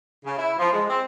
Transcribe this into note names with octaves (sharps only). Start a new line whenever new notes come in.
C#3
E4
F3
G#3
C4